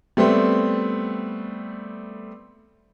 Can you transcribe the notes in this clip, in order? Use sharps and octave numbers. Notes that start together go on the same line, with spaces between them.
G3 A3 B3 C4